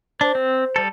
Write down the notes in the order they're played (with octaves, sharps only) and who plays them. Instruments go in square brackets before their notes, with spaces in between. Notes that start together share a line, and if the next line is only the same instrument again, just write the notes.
[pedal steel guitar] D4 [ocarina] C5
[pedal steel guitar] C4
G3 A4